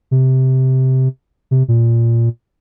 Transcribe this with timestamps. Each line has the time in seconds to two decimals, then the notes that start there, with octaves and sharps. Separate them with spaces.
0.11 C3
1.51 C3
1.68 A#2